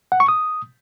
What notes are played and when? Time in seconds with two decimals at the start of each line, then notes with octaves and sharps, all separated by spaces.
0.12 F#5
0.20 C#6
0.28 D#6